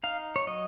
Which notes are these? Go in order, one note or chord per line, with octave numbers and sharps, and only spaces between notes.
D#4 F5
C#5
F#3 D#5